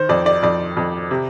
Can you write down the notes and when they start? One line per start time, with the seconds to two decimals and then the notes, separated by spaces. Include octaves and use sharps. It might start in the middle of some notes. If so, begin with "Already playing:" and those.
Already playing: D#3 C5
0.09 F2 D5
0.26 D5
0.43 F2 D5
0.77 F2
1.11 C3